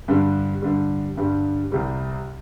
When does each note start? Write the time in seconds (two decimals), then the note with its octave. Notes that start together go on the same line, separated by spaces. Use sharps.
0.08 G2 D3 G3
0.62 G2 D3 G3
1.17 G2 D3 G3
1.72 C2 C3 G3